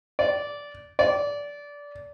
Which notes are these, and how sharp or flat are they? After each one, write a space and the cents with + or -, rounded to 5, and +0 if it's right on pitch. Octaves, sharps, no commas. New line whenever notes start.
D5 -15
D5 -20